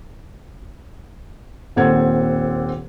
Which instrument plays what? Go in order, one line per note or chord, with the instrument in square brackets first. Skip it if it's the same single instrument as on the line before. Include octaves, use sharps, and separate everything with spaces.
[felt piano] D#1 A#2 C4 A4 F#5 G#6